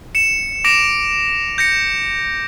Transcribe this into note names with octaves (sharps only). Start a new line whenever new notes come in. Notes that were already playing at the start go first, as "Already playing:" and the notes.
C#7 E7
D6 A#6 D7 E7
G6 A#6 C#7